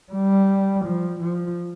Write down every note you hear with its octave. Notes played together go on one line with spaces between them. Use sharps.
G3
F3
F3